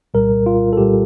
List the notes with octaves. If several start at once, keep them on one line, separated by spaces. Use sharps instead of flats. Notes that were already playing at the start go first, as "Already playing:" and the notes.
C2 A#2 G3 A#4
F4
A4
C2 A#2 G3 G4